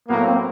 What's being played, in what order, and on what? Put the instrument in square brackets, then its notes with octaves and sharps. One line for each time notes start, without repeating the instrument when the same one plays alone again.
[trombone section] A2 F#3 A#3 [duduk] B3
[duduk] C4